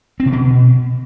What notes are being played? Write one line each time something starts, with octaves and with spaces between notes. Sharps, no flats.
C4
C3
B2